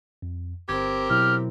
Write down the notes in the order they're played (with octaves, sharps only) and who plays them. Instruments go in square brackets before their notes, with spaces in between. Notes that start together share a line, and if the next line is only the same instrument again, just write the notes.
[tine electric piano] F2
[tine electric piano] G1 G#6 [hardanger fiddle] C4 A#4 [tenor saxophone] G4
[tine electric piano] B2 F#3 E4 [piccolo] F6